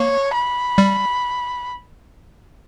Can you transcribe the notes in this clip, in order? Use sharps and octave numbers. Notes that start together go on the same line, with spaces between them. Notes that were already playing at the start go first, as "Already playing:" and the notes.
Already playing: A#3 C#5
B5
G3